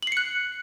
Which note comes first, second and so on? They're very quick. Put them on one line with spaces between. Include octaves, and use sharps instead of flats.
F#7 C7 C#7 F#6